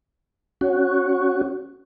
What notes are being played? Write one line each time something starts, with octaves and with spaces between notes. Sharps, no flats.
C#4 F#4